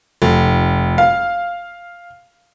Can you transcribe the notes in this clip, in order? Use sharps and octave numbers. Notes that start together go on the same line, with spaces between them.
F1
F5